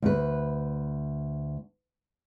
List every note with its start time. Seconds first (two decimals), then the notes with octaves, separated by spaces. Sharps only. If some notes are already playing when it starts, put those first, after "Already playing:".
0.02 D2 B4